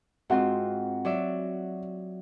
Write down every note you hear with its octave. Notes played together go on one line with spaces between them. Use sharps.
G#2 C4 F4 F#4 F#5
F#3 D5 E5